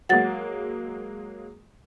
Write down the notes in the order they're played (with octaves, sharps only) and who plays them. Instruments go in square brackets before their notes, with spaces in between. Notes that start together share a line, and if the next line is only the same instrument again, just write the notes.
[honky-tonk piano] F#3 G#3 A#3 [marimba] F#5 A6